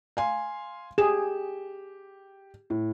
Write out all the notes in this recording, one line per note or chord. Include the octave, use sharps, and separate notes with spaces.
F5 G#5 C6
G4 G#4 E7
A2